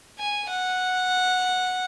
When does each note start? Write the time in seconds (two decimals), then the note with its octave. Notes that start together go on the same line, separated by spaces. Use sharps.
0.19 G#5
0.49 F#5